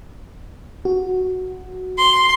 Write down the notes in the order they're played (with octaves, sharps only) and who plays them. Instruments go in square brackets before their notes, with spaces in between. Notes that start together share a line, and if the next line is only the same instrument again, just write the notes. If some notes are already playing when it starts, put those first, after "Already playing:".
[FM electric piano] F#4
[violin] C6